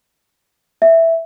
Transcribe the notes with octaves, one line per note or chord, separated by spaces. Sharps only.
E5